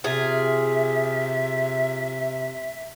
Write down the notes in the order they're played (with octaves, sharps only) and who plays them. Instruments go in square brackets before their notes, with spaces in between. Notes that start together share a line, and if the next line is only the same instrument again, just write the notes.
[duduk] C3 [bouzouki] F4 G#4 [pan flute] E5